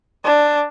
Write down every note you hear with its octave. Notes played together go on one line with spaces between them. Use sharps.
D4